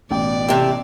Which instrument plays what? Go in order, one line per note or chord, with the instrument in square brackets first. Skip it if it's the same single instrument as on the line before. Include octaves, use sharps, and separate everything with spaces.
[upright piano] A1 G5 [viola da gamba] B2 D5
[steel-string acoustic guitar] C3 A3 [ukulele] G4